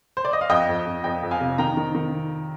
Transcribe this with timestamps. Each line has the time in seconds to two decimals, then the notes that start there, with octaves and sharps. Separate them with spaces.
0.17 C5
0.25 D5
0.33 D#5
0.41 F5
0.50 F2 D#5 G5
0.69 F2
0.86 F2
1.04 F2 D#5 G5
1.23 F2
1.31 F5 G#5
1.41 C3
1.58 D#3 G5 A#5
1.77 D#3
1.95 D#3